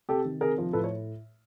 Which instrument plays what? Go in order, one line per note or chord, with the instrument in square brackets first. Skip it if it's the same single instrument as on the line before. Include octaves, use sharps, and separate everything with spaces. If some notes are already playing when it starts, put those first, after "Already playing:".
[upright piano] C3 G4 A4
D#3
C3 G#4 A#4
F3
A2 A4 B4
C#5